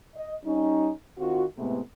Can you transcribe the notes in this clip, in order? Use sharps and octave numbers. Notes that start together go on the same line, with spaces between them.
D#5
G3 C#4 D#4
D#3 C4 F4 F#4
A2 C3 G#3 A3 B3